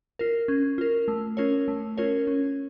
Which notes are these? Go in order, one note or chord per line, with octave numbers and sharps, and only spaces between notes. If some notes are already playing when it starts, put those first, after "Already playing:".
F4 A#4
C#4
F4 A#4
A3
C#4 F4 A#4 C#5
A3
C#4 F4 A#4 C#5
C#4